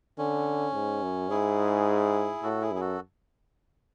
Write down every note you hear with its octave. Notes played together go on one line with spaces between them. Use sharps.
D3 C#4
G#2
F#2
G#2 E4 G#4
A2 F#4 A4
E4 G#4
F#2 G#4
F#4 A4